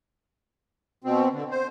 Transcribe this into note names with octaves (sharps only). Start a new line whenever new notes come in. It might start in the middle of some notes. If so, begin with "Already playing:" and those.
B2 C4
D3
C5